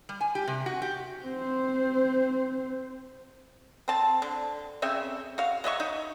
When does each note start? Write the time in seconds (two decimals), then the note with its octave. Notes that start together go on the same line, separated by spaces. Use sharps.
0.09 G3
0.21 G#5
0.35 G4
0.48 C3
0.66 F#4
0.82 G4
1.23 C4 C5
3.88 C4 A5
4.22 D3
4.82 C#3 C4 E5
5.38 F#4 F5
5.64 F#3 D#5 E5 C#6
5.80 D#4